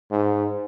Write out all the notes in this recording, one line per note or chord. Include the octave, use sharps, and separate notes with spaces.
G#2